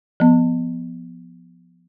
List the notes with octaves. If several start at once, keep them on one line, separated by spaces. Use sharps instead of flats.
F3 B3